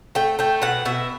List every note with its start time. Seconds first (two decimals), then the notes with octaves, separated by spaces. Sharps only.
0.15 A3 G5
0.39 A3 G5
0.62 B2 F#5
0.85 B2 E5